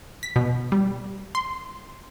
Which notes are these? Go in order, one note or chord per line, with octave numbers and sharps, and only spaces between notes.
B6
B2
G3
C6